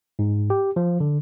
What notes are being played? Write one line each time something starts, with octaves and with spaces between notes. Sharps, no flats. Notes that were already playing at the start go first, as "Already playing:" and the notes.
G#2
G4
F3
D3